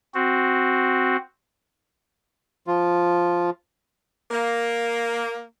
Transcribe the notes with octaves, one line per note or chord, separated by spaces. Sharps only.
C4 F#4
F3 F4
A#3